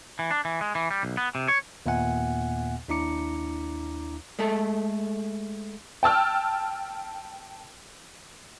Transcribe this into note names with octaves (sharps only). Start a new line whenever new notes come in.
E3
D4
E3
G#3
E3
G3
B1
B3
C3
C#5
D#2 A#2 B3 E5 F#5 G#5
D#2 D4 E4 A#5 D6 C#7
G#3 A3 A4
G5 A5 E6 F6